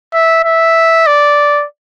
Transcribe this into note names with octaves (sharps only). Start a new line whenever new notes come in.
E5
E5
D5